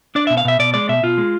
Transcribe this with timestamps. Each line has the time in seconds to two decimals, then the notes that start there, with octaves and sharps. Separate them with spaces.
0.15 D4 D5
0.27 B2 E5
0.37 F5
0.45 B2 E5
0.59 B2 D5
0.74 G#3 D5
0.89 B2 E5
1.03 B2 F4
1.18 G#3